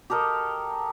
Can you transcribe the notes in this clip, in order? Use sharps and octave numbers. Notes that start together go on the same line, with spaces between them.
G4 A4 A#4 D#5